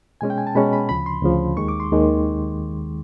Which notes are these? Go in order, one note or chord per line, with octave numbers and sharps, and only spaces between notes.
B2 G#3 C#4 G#5
G5
G#5
A5
B2 G#3 C#4 B5
B5
D2 C#3 F3 B5
C6
D2 C#3 F3
D#2 D#3 G#3 C#6
D6
C6
D#2 D#3 G#3